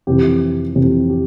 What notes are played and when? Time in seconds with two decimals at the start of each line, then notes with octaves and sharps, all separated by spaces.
0.07 F2 C3 E3 G4
0.75 F2 C3 E3
1.10 G4